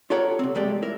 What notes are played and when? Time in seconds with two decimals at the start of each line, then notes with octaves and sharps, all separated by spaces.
0.10 F4 G4 A4 A#4 C#5 F#5
0.39 C3 C4
0.55 E2 G2 G#3 A3 G4 D5
0.82 E4 A#4